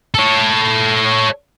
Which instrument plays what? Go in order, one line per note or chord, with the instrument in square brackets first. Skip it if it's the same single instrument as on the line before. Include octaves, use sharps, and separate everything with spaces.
[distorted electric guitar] A4 C#5